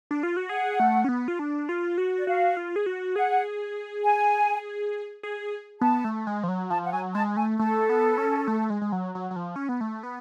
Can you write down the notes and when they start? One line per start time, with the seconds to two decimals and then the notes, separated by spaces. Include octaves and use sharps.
0.11 D4
0.23 F4
0.37 F#4
0.49 G#4 F#5
0.80 A3
1.04 C#4
1.09 B3
1.28 F4
1.39 D4
1.69 F4
1.98 F#4
2.17 D5
2.27 F#4 F5
2.57 F4
2.76 G#4
2.86 F#4
3.16 G#4 F#5
4.04 G#5
5.23 G#4
5.81 B3 A5
6.04 A3
6.27 G#3
6.43 F3
6.48 F#3
6.70 F3 A5
6.86 F#5
6.92 F#3 G#5
7.14 G#3 A5
7.36 A3 G#5
7.59 A3 A4
7.89 B3
8.18 C#4
8.48 A3
8.70 G#3
8.82 G#3
8.92 F#3
9.15 F#3
9.31 F#3
9.36 F3
9.56 C#4
9.69 B3
9.81 A3
10.03 B3